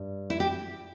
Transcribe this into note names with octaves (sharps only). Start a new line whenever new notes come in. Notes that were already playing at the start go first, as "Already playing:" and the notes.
Already playing: G2 G3
E4
G4